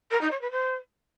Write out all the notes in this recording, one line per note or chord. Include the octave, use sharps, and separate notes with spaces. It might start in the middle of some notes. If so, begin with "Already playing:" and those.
A#4
D#4
C#5
B4
C5